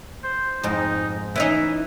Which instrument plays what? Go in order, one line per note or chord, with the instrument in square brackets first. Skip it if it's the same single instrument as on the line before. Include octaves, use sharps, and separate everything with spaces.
[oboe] C5
[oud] F2 G#2 [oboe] D#4
[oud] E3 C#4 D#4 [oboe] E5